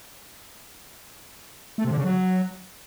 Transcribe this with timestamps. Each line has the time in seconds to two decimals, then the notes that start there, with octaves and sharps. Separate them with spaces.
1.78 A3
1.85 C3
1.91 D3
1.98 C#3
2.04 F#3